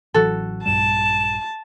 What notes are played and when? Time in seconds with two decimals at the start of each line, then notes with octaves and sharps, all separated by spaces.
0.14 A1 E3 F#3 F#4 A4
0.66 A#1 G2 G3 A5 E7